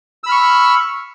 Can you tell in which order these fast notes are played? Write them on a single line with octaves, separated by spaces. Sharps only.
E6 B5 F6 C#6